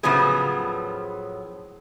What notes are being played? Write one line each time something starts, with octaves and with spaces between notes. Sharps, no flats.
A2 C#3 F3 F#3 B3 G#4